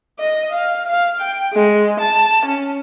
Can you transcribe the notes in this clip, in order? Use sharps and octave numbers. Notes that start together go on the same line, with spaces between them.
D#5
F5
F5
G5
G#3
A5
C#4